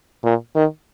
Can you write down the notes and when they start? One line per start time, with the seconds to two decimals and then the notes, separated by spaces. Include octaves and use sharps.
0.24 A#2
0.55 D#3